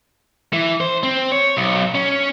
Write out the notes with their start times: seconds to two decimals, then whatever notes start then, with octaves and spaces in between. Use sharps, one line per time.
0.53 E3
0.80 C5
1.03 C4
1.32 C#5
1.57 B1
1.95 C#4